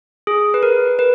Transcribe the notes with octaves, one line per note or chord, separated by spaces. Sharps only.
G#4
B4
A#4
B4